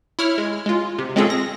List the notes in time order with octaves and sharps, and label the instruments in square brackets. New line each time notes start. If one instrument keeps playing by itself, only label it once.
[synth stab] E4 C#5 F6
G#3
G#3 F4
C3
G#3 C4 C#4 F4 G#4 A4
A#6